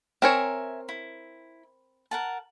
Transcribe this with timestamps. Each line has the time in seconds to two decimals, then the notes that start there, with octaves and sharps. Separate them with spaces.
0.22 C4 A#4 C#5 E5 G#5 A#5
0.89 E4
2.11 A#4 F#5 A5